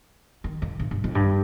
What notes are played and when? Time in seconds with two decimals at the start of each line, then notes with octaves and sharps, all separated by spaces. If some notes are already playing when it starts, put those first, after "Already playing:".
0.44 D#3
0.62 F2
0.79 G2
0.91 G2
1.04 F2
1.15 G2